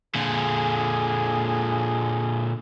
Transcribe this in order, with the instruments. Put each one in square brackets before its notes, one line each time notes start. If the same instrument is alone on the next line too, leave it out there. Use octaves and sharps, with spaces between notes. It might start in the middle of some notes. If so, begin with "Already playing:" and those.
[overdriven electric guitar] A#2 D3 [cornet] G#4